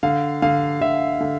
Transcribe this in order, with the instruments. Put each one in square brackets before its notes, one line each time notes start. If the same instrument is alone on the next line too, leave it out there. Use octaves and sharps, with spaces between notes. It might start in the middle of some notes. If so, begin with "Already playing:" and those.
[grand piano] D3 F5
D3 F5
D3 E5
D3